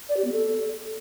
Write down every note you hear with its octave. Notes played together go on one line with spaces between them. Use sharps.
D5
G4
B3
A4